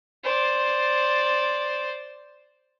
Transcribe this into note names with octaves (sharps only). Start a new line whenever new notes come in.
C5 D5